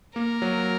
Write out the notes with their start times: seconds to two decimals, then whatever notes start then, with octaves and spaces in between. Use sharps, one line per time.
0.16 A#3 A#4
0.42 F#3